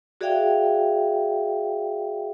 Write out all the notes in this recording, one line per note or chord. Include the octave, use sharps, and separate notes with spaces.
F#4 G#4 D5 E5 F5 G5